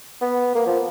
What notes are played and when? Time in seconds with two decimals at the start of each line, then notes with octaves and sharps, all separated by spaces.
0.21 B3
0.55 A#3
0.67 F3